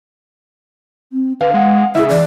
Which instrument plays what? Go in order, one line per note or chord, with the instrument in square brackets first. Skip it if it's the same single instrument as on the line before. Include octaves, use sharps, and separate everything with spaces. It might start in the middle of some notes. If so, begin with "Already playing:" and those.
[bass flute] C4
[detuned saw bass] D3 [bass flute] B4 [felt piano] F5
[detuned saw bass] G#3 [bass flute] F#5
[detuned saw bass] C#3 [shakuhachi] E4 [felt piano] G#4 E5
[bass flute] E3 [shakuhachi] D5